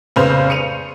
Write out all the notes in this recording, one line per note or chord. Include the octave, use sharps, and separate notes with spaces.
F1 C#3 B3 C5 F7
C#7 D#7 F7